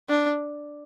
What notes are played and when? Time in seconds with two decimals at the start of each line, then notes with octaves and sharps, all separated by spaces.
0.09 D4